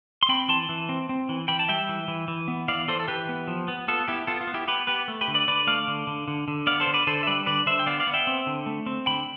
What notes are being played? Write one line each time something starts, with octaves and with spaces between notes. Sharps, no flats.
C6
C4 G5 B5
E3 A5 C6
E3
C4
C4
E3
E3 G5 B5
A5
G3 E5 G5
E3
E3
E3
B3
E3 D5 F5
E3 A4 C5
A4
E3 G4 B4
B3
F3
B3
B3 F4 A4
B3 E4 G4
B3 F4 A4
F4
B3
E4 G4
B3 G4 B4
B3 G4 B4
A3
G4 B4
D3
B4 D5
D3 B4 D5
A3 D5 F5
D3
D3
D3
D3
B3 D5 F5
A4 C5
D3
B4 D5
D3 A4 C5
E5
G3 B4 D5
D3 B4 D5
D3 C5 E5
G5
B3 D5 F5
D5 F5
B3
E5 G5
C4
D3
A3
C4
D3 G5 B5